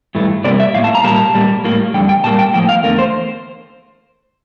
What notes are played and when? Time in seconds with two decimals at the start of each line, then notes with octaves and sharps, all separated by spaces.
0.15 G2 E3 A3
0.44 C3 G3 A#3 D5
0.60 E5
0.74 A2 G3 F5
0.79 A#3
0.84 A5
0.95 A#5
1.04 A#2 G3 A#3 A5
1.34 A#2 G3 A#3
1.64 A2 G3 A#3
1.94 F2 D3 G3 G5
2.09 G5
2.24 A#2 G3 A#3 A5
2.39 G5
2.54 A2 F3 A#3 G5
2.69 F5
2.83 E2 D3 A3 A#4
2.99 C5